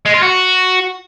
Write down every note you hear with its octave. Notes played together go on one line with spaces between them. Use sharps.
G#3
F4
F#4